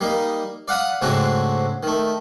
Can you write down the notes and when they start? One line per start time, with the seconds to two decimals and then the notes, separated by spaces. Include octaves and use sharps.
0.01 G3 A#3 D#4
0.68 D5 F5 F#5 B5 D#6
1.02 G#2 C#3 A3 C4 D4 F#4
1.83 D#3 A3